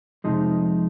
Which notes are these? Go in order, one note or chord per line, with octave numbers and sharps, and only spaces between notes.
F2 C3 F3 G#3 D#4